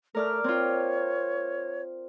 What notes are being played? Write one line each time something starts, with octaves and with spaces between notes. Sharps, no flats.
A3 A#4 D5 F6
C4 F4 C#5